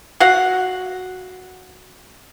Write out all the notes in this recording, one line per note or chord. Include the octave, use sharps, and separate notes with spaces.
F#4 F5 F#5